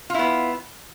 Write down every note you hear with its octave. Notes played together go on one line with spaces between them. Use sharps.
B3 E4 F4